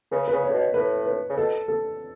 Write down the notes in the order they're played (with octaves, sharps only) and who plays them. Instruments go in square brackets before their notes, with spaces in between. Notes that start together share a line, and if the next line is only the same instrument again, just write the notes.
[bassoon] C#3 [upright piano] B4
[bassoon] C#3 [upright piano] B4
[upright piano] C#5
[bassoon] A2
B2
[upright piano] C#5
[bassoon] A2 [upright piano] B4
[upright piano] B4
[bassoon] C#3
[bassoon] B2 [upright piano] A4
[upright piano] A4